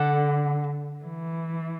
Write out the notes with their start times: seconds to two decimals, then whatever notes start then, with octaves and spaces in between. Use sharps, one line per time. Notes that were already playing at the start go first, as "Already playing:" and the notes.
Already playing: D3 A4 D5 F#5
1.04 E3